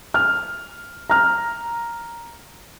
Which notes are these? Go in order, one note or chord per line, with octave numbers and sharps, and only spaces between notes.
F6
A#5 F6